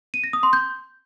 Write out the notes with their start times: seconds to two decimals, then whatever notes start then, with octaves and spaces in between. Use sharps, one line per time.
0.14 D#7
0.24 A#6
0.33 D#6
0.43 C6
0.53 G6